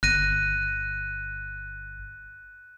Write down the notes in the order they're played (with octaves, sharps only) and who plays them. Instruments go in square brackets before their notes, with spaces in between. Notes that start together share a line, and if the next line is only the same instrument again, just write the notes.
[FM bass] G1 [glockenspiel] F#6 A#6 D#7